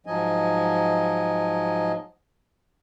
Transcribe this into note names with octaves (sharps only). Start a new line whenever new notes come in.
G#2 F3 F#3 D#5 G#5